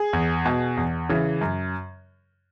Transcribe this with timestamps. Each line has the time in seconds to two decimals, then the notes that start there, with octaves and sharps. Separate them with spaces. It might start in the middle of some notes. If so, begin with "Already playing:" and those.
Already playing: G#4
0.13 E2
0.46 B2
0.77 E2
1.09 C#3 E3
1.41 F#2